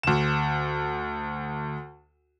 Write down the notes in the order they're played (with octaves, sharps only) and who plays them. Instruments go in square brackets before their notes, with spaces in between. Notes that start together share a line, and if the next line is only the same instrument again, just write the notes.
[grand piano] D2 E7